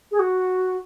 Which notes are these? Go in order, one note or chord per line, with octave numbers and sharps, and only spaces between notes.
G#4
F#4